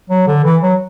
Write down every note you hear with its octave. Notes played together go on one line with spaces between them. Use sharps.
F#3
D3
E3
F#3